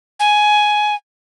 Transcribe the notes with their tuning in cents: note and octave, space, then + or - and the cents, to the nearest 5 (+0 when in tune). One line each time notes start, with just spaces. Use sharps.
G#5 +10